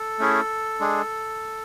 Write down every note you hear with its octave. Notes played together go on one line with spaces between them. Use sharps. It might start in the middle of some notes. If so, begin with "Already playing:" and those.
Already playing: A4
A3 C#4 E4 G#4
G#3 D4 G#4